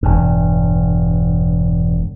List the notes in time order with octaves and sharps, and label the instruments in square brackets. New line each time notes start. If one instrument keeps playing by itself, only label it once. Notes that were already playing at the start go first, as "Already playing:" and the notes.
[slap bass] E1 G2